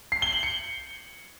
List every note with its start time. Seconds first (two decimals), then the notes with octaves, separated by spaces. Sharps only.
0.12 C7
0.22 G7
0.33 F#7
0.43 C#7